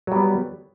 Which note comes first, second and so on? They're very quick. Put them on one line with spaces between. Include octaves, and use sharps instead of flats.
F#3 G3 B3